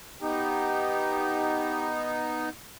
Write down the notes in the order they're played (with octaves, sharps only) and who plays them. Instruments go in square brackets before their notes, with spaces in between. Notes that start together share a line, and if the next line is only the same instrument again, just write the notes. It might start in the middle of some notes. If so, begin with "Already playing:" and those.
[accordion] B3 D#4 [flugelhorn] G4